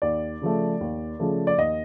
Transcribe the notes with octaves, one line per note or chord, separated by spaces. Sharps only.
D#2 D5
C#3 F3 A3
D#2
C#3 F3 A3
D5
D#2 D#5